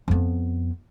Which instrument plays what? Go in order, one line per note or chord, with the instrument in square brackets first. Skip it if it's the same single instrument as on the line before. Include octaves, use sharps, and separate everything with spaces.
[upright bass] F2 B3